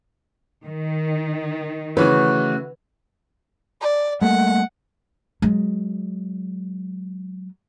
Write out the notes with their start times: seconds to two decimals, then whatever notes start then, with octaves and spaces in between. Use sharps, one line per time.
0.67 D#3
1.97 C#3 E3 A3 C#4 F#4 B4
3.81 D5
4.21 G3 A3 A#3 F#5
5.42 F#3 G#3